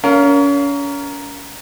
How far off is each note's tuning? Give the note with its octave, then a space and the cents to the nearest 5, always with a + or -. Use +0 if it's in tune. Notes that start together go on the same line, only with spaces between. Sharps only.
C#4 +35 A#4 +0 F5 +0